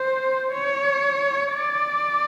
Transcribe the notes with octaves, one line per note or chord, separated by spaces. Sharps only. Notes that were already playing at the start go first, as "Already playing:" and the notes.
Already playing: C5
C#5
D5